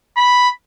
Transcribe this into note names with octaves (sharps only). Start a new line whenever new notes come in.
B5